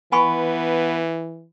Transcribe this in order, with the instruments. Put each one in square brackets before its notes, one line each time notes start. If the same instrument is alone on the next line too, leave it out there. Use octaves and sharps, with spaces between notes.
[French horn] E3 [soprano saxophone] B3 [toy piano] G#5 B5 C#6